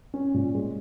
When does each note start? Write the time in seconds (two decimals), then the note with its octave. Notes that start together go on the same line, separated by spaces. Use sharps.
0.14 C#4
0.34 A#2
0.55 G#3